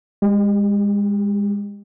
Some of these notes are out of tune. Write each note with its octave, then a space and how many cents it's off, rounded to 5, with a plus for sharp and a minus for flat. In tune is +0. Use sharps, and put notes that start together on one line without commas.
G#3 -35 G4 +10